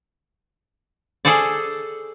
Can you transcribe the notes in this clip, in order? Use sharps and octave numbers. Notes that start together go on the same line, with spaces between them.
G#4 A4 C5 D5